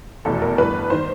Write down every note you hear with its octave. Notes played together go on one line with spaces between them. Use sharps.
F1 E2 B2 A4
A#4
G1 G2 E3 B4
D#3 C5